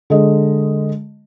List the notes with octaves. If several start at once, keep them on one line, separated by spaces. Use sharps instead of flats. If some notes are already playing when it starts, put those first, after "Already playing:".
D3 G#3 D#5